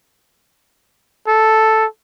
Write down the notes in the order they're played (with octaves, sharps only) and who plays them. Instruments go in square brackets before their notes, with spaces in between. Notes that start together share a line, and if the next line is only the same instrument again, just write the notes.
[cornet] A4